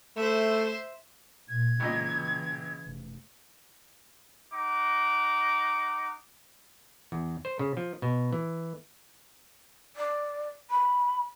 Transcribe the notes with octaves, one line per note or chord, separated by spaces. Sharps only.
A3 C5 E5
A#2 G#6
G#1 A#2 C#3 E3 D#5
F1
D#4 F#5 D6
E2
C5
C#3
F3
B2
E3
D5
B5